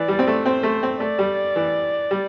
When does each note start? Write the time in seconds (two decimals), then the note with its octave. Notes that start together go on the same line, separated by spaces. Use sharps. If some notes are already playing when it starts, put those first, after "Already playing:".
Already playing: E3 D5
0.08 G3
0.19 C4
0.27 A3
0.45 C4 C5
0.63 A3
0.83 C4
1.00 A3 D5
1.19 G3
1.56 E3
2.11 G3